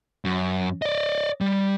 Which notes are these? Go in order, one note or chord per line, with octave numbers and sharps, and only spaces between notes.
F#2
D5 D#5
G3